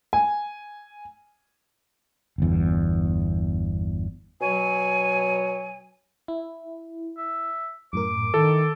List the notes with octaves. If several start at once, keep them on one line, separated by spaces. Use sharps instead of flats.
G#5
G1 E2
B2 F#3 C#5 G#5
E4
E5
F#2 A2 A#4 D6
D#3 E4 A4